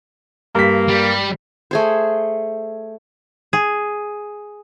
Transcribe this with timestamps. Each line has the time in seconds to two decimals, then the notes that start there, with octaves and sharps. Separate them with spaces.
0.55 G2 A#3 B6
0.89 G3
1.71 A3 G#4 C5
3.53 G#4